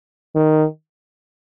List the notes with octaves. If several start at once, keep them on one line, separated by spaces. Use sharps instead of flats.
D#3